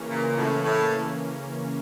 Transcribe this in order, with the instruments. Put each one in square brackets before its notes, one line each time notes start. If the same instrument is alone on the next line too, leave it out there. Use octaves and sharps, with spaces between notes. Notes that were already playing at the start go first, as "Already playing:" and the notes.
Already playing: [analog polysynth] C#3 E3 A#3 C#4
[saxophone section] A#2 [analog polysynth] E3
[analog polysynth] A#3
[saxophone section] A2
[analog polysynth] C#4
[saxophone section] A2
[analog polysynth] C#3